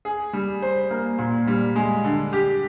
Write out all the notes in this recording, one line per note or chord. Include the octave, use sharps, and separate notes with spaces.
G#4
G3
C5
A#3
A#2
G3
G#3
D3
G4